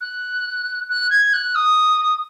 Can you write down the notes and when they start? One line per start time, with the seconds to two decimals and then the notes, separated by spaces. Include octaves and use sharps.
0.01 F#6
0.89 F#6
1.10 G#6
1.33 F#6
1.55 D#6